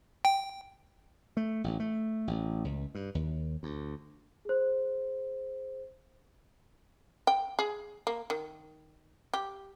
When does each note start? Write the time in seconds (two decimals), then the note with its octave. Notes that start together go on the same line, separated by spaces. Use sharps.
0.25 G5
1.37 A3
1.64 A1
1.80 A3
2.27 A1
2.64 C#2
2.95 G2
3.15 D#2
3.63 D2
4.45 G#4 C5
7.27 G5
7.59 G#4
8.07 A#3
8.30 D#3
9.34 G4